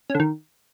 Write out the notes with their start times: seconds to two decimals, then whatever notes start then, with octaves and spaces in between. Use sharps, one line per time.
0.10 C#4
0.15 D3
0.20 D#3